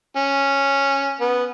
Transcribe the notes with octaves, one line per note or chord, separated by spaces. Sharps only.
C#4
B3